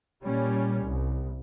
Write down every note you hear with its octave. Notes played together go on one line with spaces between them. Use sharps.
A#2 G3 C#4
C2